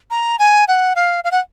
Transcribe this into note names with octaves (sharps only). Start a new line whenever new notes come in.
A#5
G#5
F#5
F5
F5
F#5